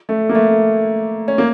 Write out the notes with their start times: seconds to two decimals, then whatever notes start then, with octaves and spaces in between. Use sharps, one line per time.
0.09 A3
0.29 A#3
0.35 A3
1.28 C#4
1.38 A#3